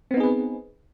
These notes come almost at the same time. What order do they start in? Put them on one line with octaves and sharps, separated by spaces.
C4 B3 D#4 G#4 B4